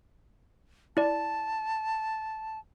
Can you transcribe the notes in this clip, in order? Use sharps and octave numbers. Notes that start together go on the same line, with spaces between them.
E4 D5 A5